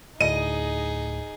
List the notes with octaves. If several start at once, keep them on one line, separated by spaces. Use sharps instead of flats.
D2 A2 D#4 G#4 D#5 D#7